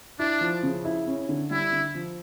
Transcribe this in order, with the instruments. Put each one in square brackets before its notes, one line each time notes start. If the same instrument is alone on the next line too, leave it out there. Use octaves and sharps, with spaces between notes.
[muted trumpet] D4 [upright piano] E4
[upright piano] F3
C#3
E4
C#4
D3
[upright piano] G3 [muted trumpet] E4
[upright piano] D3
F3